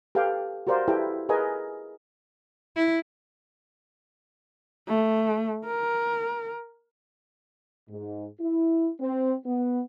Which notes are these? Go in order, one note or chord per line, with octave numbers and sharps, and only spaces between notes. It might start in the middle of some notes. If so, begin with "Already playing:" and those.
G4 A4 B4 F5 G5
F#4 G4 A#4 C5 D5 F5
E4 G4 A4 B4 G5
G#4 A#4 B4 D#5 G#5
E4
A3
A#4
G#2
E4
C4
B3